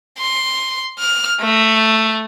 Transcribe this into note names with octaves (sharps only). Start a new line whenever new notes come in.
C6
F6
A3